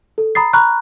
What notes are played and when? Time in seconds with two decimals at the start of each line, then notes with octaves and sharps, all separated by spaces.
0.18 A4
0.35 A#5 B5 D#6 A6 C7
0.53 A#5 B5 C#6 F6 F#6